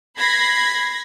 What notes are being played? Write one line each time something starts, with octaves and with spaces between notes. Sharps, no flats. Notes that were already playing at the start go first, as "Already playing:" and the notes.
B5 G#6 A#6 C7